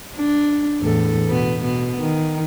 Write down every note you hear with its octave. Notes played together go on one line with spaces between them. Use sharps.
D4
E2 A2 A4
B2 B3
B2 B3
D#3